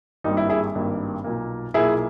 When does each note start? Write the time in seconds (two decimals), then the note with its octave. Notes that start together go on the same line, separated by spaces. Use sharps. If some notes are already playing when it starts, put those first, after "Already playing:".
0.24 G#1 G2 G3 A#3 D#4
0.37 E4
0.49 E4 G#4
0.75 G#1 G2 G3 A#3
1.24 B1 A#2 A#3
1.74 B1 A#2 A#3 E4 G#4